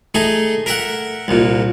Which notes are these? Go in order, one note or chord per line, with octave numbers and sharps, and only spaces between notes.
A3 D#4 G#4
A#4 E5 F#5
C2 A#2